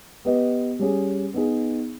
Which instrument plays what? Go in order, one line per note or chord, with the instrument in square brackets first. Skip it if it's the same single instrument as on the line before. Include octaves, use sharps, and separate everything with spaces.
[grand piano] B3 G4 B4 D#5
G3 C#4 G#4
B3 D#4 G#4